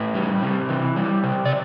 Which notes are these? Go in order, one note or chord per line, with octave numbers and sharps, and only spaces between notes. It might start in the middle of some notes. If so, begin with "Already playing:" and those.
Already playing: A2 B4
G3
C3
E3
G3
C3
D5